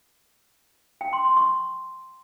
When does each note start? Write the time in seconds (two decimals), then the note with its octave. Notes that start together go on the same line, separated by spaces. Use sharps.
1.01 G5
1.13 C6
1.25 C6
1.37 C#6